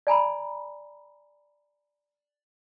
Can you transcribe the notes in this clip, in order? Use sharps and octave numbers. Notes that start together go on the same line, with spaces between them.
D5 G#5 A#5 B5